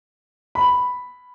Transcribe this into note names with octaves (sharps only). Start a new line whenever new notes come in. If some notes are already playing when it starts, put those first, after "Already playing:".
B5